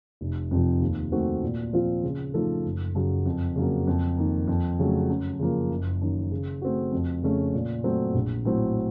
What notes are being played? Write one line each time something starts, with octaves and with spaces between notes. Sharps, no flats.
F1
F2 C3 F3
D#2
D#3 A3 C4 F#4
A#2
F3 C4 F4
C#3
F3 A3 D#4 A4
F#1
F#2 C#3 F#3
F2
C#3 F#3 A#3
F2
D#3 A#3
F2
C#3 F#3 A3
F#2
C#3 F3 A#3
F#1
F#2 D#3
C#3
A3 C4 F#4
F2
C#3 A3 C#4
A#2
F#3 A3 C4
A#1
A2 F#3 C4